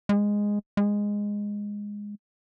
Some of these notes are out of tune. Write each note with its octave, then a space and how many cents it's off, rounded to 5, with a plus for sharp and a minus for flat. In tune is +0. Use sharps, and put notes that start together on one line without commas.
G#3 -10
G#3 -10